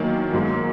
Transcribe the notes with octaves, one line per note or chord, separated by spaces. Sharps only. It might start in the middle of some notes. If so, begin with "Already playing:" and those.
Already playing: E2 D#3 F#3 A#3
G#2 F#3